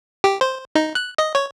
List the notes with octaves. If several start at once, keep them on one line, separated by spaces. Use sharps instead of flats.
G4
C5
D#4
F#6
D#5
C#5